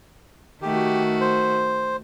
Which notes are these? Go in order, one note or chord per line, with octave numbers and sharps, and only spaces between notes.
D#3 A3 F#4 G4
C5